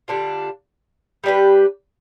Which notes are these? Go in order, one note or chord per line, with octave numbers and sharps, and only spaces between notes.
D3 G3 D4 F4
G3 D4 G4 B4